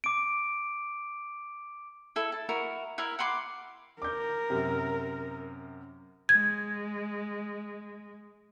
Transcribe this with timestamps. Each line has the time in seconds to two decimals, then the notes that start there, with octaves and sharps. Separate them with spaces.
0.04 D6 D7
2.16 E4 A4
2.32 A5
2.49 E4 F#4 A#4
2.98 E4 A#4 E5
3.19 F#5 B5 C6 D6
4.02 A#4 D6 G6
4.50 F#2 C3
6.29 G#3 G#6